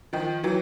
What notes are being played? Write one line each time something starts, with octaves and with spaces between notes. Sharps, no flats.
D#3 F3
E3 F#3